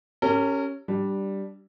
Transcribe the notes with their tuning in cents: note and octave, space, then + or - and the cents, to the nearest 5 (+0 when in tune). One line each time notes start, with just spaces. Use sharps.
C#4 +0 G4 +0 A#4 -35
G3 -5 D4 +0